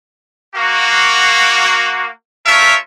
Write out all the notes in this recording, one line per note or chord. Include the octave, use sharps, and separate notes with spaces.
A#3 F#4
A3 F4 A#4 C#5 E5